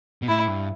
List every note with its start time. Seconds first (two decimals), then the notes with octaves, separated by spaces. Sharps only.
0.22 B2
0.28 A2 E4
0.48 G2